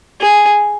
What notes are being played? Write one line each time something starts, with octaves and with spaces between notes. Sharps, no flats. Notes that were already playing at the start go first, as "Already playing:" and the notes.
G#4